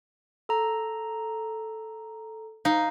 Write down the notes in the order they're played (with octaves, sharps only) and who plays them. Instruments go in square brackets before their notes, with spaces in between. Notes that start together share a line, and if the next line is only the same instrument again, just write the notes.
[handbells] A4 A#5
[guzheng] D#4 [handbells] F5